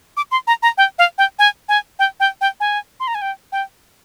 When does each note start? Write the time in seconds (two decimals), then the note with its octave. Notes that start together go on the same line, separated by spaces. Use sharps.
0.17 D6
0.31 C6
0.47 A#5
0.62 A#5
0.77 G5
0.98 F5
1.18 G5
1.39 G#5
1.68 G#5
1.99 G5
2.20 G5
2.41 G5
2.60 G#5
3.00 C6
3.07 A#5
3.15 G#5
3.22 G5
3.52 G5